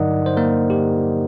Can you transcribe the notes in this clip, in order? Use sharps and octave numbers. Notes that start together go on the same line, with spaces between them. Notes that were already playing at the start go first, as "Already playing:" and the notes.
Already playing: G2 D3 F#3 D#4 A#4 D5 D#5 F#5
C5
A#3 A#4
G4